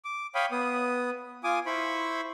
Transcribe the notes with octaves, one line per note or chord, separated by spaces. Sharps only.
D6
C#5 F5 G5 B5 D#6
B3 D#6
F4 G#5 D6 D#6
E4 C5 B5 C#6